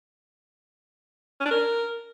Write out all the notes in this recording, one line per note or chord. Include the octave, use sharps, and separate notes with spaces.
C#4
D4
A#4